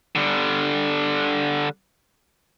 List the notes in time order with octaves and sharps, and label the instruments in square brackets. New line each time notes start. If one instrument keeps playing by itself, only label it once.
[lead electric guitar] D3 G3